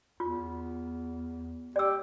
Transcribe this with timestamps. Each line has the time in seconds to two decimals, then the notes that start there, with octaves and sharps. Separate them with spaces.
0.20 E2 F4
1.76 G4 D5 E6